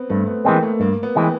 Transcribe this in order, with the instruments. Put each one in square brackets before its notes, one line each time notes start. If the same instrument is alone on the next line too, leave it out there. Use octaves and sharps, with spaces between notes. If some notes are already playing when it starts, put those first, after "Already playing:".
Already playing: [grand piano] B3 C4
[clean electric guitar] G2 [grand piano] A3
[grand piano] B3
[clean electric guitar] E3 G#3 C4 [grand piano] A#3
[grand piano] A3
[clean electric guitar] G2 [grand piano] A#3
[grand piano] B3
[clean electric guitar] E3 G#3 C4